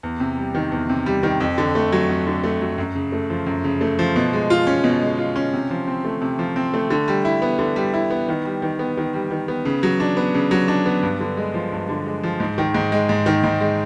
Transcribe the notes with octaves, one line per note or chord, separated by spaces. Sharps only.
E2
C3
G3
D#3
E2
C3
G3
D#3
F2
D3
A3
F#3
F2
D3
A3
F#3
F#2
C#3
A3
F3
F#2
C#3
A3
F3
B2
G#3
F4
C#4
B2
G#3
F4
C#4
C3
F3
C4
A3
C3
F3
C4
A3
D3
G3
E4
B3
D3
G3
E4
B3
D#3
G3
D#3
B3
D#3
G3
D#3
B3
C#3
F#3
D4
B3
C#3
F#3
D4
B3
G2
D3
G#3
F3
G2
D3
G#3
F3
G#2
D#3
G#2
G#3
G#2
D#3
G#2
G#3